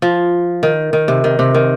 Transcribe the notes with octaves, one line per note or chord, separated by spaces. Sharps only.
F3
D#3
D#3
C3
D#3
C3
D#3